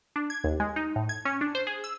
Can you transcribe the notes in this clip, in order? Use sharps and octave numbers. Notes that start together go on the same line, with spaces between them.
D4
G#6
D#2
G#3
D#4
A2
G#6
C#4
D4
C5
G#4
E6